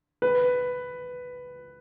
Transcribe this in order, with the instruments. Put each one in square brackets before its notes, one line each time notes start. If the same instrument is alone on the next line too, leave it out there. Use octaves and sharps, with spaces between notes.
[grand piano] B4